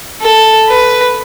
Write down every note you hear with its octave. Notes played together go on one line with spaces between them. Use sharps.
A4
B4